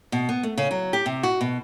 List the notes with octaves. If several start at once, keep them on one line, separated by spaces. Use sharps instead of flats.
B2
B3
A3
C#3
F#3
G4
C3
F#4
B2